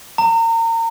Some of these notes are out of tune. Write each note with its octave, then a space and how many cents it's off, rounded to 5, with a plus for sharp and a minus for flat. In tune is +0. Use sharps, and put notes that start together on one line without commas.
A#5 -35